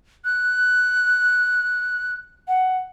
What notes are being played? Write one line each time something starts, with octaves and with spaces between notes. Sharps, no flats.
F#6
F#5